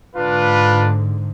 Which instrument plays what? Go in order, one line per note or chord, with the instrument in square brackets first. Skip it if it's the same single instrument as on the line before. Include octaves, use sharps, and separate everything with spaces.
[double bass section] G#2 D3 [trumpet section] D4 F4 B4